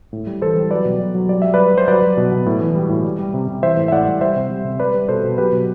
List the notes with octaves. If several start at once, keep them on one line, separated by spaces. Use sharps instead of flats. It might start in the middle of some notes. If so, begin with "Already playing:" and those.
A2
G3
E3 A4 C5
G3
F#3 B4 D5
B2
F#3
F#3
G3 D5
G3 E5
G3 B4 D5
G3 C5
F#3 B4 D5
F#3
B2
B2
A2
E3
G3
A2
G3
G3
C3
C3
E3 C5 E5
A2
E5
A2 D5 F#5
G3
G3 C5 E5
C3
G3
C3
G3 B4 D5
G3
B2 A4 C5
B2
F#3 G4 B4
B2